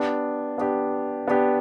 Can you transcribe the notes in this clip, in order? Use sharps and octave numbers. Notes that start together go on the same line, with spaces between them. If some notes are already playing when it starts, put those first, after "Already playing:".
Already playing: B3 D4 G4
B3 D4 G4
B3 D4 G4